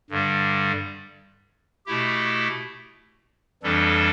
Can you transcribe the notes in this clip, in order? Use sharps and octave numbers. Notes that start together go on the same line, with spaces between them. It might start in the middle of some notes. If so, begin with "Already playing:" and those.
G2 D3 G3
B2 A3 E4 G4
F2 E3 G3 D4 A4